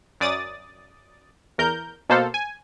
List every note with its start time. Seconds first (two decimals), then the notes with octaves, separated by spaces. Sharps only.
0.20 F#2 D5 D#6 A6
1.58 E2 A#4 G6
2.09 B2 A#3 A4 C5 F5
2.34 G#5